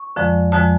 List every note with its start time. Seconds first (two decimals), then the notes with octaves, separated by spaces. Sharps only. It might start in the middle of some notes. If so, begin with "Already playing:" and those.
Already playing: C#6
0.16 F2 D3 F3 G#3
0.52 F2 D3 F3 G#3 A5